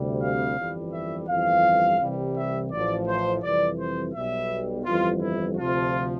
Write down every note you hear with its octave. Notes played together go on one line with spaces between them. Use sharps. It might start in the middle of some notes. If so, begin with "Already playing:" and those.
Already playing: D2 C3 G3
F5
G1 F2 E3 G3
E5
G1 F2 E3 G3 F5
C2 C3 E3 G3
E5
A1 A2 F3 D5
C5
F2 C3 E3 G3 D5
C5
B1 B2 G3 E5
G1 F2 E3 G3 F4
E4
D2 C3 F3 F4